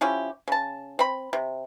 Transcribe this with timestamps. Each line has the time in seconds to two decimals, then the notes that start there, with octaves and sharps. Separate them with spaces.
0.01 F3 C#4 E4 G4
0.48 C#3 A5
0.99 C4 B5
1.33 C3